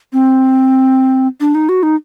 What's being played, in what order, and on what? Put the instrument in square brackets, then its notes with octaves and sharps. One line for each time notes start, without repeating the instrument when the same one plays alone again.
[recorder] C4
D4
D#4
F#4
D#4